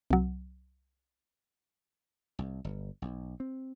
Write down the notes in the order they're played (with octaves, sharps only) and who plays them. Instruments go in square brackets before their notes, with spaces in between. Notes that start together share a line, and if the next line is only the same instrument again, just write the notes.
[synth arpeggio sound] C2 F#3
[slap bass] C2
G1
B1
C4